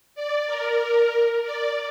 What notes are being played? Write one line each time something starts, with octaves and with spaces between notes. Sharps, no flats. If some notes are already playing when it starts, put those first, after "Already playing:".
D5
A#4
A#4
D5